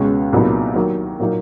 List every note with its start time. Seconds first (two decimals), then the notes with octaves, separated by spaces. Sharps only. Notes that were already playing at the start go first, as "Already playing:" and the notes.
Already playing: C#2 B2 G#3 C#4
0.33 C2 A#2 F#3 B3 D#4
0.75 D#3 F#3 A#3
1.20 A#2 F#3 A#3 D#4